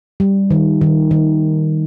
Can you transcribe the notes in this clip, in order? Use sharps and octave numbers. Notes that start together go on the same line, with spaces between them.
G3
D#3
D#3
D#3